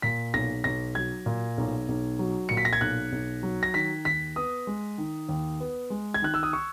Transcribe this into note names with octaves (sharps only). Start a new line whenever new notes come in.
A#2 B6
B1 A#6
B1 A#6
F#3 G#6
A#2
B1
B1
F#3
A#2 C#7
B6
A#6
G#6
B1 F#6
B1
F#3
A#6
D#3 B6
D#2 B6
B3 D#6
G#3
D#3
D#2
B3
G#3
G#6
D#3 F#6
E6
D#6
C#6